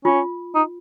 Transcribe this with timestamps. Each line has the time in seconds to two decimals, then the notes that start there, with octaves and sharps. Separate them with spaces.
0.05 C#4 F4
0.55 D#4